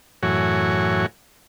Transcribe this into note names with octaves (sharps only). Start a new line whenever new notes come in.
F#2 A2 E3 F#4 C#5 G#5